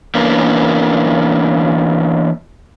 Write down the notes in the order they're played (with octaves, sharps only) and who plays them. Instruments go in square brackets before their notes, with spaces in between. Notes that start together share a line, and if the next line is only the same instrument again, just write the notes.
[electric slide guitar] E3 A#3 B3 C#4 D4 A#4